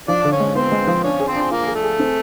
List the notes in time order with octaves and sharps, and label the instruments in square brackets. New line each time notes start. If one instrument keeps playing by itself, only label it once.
[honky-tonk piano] F3 [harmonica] D4 D5
[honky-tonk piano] D3
[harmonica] C#4 C#5
[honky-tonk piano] G#3
[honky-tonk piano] B3 [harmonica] C4 C5
[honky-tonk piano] G#3
F3
[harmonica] C#4 C#5 [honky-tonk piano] D4
[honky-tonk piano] G#4
[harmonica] C4 C5
[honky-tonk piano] D4
[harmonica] A#3 A#4 [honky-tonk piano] F4
[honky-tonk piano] G#4
[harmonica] A3 A4
[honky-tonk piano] G#4
C4